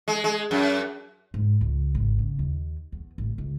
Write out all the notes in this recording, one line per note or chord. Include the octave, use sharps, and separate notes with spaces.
G#3
G#3
F#2
G#2
C#2
G#1
C#3
D#2
E2
A1
C#2